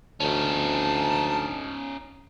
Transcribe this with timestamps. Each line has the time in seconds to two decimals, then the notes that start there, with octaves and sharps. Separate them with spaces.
0.20 D2 C#4 D#4 A5